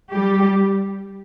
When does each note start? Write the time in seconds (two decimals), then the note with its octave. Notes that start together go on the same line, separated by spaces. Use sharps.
0.13 G3 G4